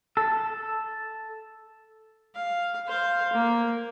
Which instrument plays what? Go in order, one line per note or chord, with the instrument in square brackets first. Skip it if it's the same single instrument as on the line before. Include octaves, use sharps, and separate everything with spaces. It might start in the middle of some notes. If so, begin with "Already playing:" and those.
[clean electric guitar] A4
[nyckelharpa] F5
C5 F5
A#3